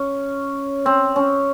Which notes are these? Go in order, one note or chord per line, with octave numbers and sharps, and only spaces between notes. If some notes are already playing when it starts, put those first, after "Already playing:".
Already playing: C#4
C4
C#4